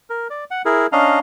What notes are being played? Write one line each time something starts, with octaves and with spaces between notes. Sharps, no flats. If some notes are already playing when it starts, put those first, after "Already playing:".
A#4
D5
F#5
E4 G#4 A#4
C#4 D4 D#5 F5 A#5